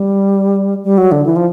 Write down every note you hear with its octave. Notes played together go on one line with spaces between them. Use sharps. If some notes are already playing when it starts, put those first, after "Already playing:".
Already playing: G3
G3
F#3
D3
E3
F3